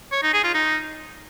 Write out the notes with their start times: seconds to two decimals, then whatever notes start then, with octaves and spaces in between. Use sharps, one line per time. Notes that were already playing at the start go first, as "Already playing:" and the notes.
0.12 C#5
0.23 D#4
0.33 G#4
0.44 F4
0.54 D#4